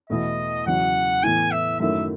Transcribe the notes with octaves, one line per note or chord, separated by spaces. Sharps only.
E2 B2 A3 E4 D#5
E2 C#3 F#3 F#5
A2 E3 B3 G#5
E5
F#2 D#3 F#3 A3 E4 E5